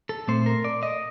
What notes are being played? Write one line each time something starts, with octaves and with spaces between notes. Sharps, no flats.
A4
A#2 A3 C4 C5
A#4
D5
D#5